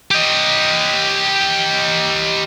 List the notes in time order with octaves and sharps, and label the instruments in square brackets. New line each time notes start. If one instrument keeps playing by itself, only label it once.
[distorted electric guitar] G4 D#5